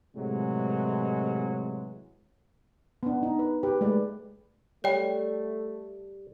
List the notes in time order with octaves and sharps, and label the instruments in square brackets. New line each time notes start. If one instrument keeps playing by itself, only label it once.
[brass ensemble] A2 C3 E3 F#3 G#3
[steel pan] B3 D4
D#4
B4
G4 B4 G5
G#3 A3 B4 D5
[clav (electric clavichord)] G3 [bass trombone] A3 [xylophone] C#5 G5